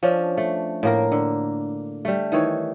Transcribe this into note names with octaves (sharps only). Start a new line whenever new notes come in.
F3 C#4 D4
A3
A2 A#3 A#4
D3
G3 A3
D#3 E3 C#5